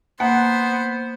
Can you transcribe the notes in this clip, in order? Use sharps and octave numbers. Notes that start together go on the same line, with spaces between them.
A#3 B3 C5 F#5